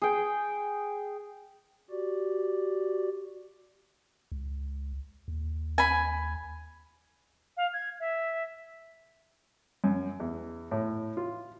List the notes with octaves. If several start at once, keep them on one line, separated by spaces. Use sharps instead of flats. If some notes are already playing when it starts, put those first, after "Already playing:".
G#4 G5
F#4 G4 D5
C#2
D#2
G#5 B5
F5
G#6
E5
F#2
E2
A2
F4